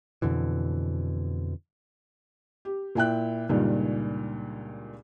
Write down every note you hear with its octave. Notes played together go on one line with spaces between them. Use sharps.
F2 B2 D3 E3
G4
A#2 E4 G5 F#6
C#2 G2 A#2 D#3